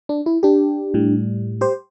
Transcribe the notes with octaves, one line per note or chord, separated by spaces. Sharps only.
D4
E4
D4 G4
A2 G3
G4 C5